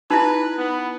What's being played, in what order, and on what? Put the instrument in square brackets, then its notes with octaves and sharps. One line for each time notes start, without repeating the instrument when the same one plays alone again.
[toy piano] D#4 E4 [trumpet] B4
[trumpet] B3